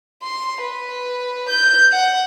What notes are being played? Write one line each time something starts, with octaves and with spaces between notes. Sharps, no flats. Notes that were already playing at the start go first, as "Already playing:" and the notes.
C6
B4
G6
F#5